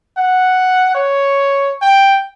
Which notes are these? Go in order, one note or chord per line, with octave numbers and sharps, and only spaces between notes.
F#5
C#5
G5